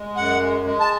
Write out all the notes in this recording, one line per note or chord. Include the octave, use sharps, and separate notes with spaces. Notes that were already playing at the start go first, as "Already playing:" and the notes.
Already playing: G#3
F#2 F#5
G#3
G#3
A5